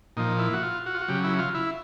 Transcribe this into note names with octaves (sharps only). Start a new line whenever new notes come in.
A#2 F3 D#4
E4
F#4
F4
F#4
F4
F#4
C#3 F#3 G4
E4
F4
E4